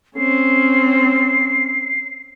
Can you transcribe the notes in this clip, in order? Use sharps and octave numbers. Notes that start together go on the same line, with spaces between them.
C4 C#4 C7